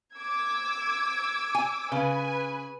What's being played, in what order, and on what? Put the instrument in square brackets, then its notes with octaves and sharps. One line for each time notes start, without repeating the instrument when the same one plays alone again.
[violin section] D6 E6 G#6
[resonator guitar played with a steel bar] G#5
[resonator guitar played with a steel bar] C#3 [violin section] B4 G#5